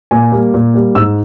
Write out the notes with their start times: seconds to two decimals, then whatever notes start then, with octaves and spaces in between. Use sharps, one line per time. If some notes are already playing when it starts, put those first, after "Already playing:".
0.11 A#2 G#5
0.32 G3 A#3
0.54 A#2
0.74 G3 A#3
0.95 G#2 E6